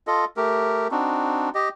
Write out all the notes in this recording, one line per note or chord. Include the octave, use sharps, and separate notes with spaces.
F4 A4 D#5
A3 G4 A#4
C4 D4 D#4 F#4
G4 D#5